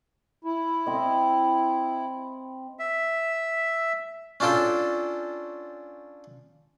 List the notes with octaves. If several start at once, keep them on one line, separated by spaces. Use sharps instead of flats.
E4
C4 D#5
E5
C#4 D4 F4 A4 G5